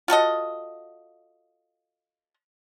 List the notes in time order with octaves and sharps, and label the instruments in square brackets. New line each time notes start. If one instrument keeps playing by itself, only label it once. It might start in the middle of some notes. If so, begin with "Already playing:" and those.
[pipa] F4 F#4 A4 D#5